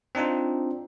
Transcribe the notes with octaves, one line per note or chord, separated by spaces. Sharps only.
C4 D4 D#4 F4